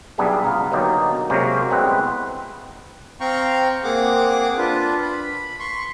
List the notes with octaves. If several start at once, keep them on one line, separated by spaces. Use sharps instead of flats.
B1 G3 B3 D4 G#4 E5
C#2 F5 F#5 A#5
B2 D3 F#3 A#3 D#4 G4
C3 F#3 G#3 A#3 C#4
G3 G#3 B3 C4 E4 B4
C4 F5 G5 A#5 C#6
A#3 C4 G#4 F#5 D6
D4 F4 B4
B5
C6 C#6